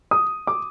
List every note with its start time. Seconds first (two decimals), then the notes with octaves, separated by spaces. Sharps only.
0.11 D#6
0.47 D6